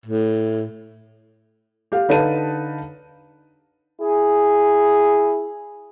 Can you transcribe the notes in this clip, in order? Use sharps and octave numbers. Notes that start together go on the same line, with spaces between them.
A2
G4 F5
D3 D#4 B4 F5 A5 D#7
E4 G#4